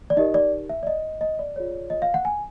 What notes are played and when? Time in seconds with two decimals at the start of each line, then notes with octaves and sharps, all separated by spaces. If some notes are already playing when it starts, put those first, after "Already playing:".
0.10 D5
0.17 D#4 G4 A#4 D#5
0.34 D5
0.69 E5
0.83 D5
0.87 D#5
1.21 D#5
1.39 D5
1.56 F4 G#4 C#5
1.90 D#5
2.02 F5
2.14 F#5
2.25 G#5